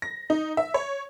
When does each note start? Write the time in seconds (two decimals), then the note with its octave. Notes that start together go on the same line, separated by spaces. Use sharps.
0.02 A#6
0.30 D#4
0.57 E5
0.74 C#5